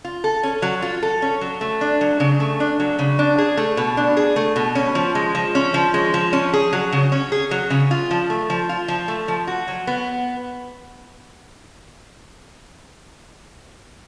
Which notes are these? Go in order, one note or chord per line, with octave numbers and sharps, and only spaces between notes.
F4
A4
C#4
F#3
F4
A4
C#4
F#3
A3
D4
F#3
C#3
A3
D4
F#3
C#3
D4
G#4
A3
B2
D4
G#4
A3
B2
C#4
F3
G#3
F3
C#4
F3
G#3
F3
C#4
G#4
F#3
C#3
C#4
G#4
F#3
C#3
F4
F3
A3
F3
F4
F3
A3
F3
F#4
F#3
B3